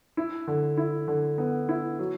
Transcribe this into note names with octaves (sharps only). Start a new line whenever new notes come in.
E4
D3
E4
D3
B3
E4
F#3